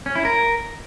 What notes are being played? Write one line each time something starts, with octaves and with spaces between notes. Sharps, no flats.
C#4
E4
A#4